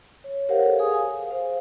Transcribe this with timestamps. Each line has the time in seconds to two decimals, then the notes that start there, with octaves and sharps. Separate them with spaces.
0.24 C#5
0.49 G4 A#4 C5 C#5 F5 F#5
0.61 A4
0.79 G#4 G#5 D#6
0.91 F5 G#5
1.31 C5 F5